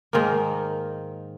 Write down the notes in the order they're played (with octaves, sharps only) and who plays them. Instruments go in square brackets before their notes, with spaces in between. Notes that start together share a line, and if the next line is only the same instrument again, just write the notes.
[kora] G#2 D#3 A#3